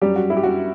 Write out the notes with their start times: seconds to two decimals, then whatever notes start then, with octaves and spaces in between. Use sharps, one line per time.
0.02 F#2 F#3 G3 G4
0.16 F#4
0.30 E4
0.37 G4
0.43 F#2 F#3 F#4